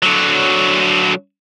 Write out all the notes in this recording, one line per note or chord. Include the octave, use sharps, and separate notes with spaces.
D3 F#3